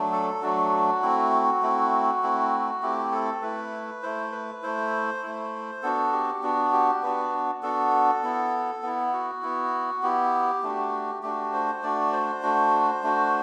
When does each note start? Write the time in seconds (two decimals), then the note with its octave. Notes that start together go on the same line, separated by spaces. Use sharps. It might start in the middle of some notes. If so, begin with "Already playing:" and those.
Already playing: F#3 A3 D4
0.12 A4
0.42 F#3 A3 D4 F#4
1.02 A3 C4 E4
1.62 A3 C4 E4
2.23 A3 C4 E4
2.82 A3 C4 E4 G4
3.12 A4
3.42 A3 E4 B4
4.03 A3 E4 C5
4.32 B4
4.63 A3 E4 C5
5.23 A3 E4
5.82 B3 D4 F#4 A4
6.13 G4
6.43 B3 D4 F#4
6.73 G4
7.03 B3 D4 F#4 B4
7.63 B3 D4 F#4 A4
8.23 B3 E4
8.83 B3 E4
9.13 F#4
9.42 B3 E4
10.03 B3 E4 G4
10.63 A3 D4 F#4
11.23 A3 D4 F#4 G4
11.53 C5
11.83 A3 D4 F#4 D5
12.13 C5
12.43 A3 D4 F#4
13.03 A3 D4 F#4